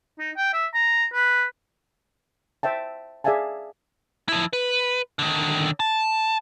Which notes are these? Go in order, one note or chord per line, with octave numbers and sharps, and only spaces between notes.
D#4
G5
E5
A#5
B4
C5 E5 G5 A5
G#4 D5 E5 F5 G#5 A5
F3 E4
B4
D3 D#3
A5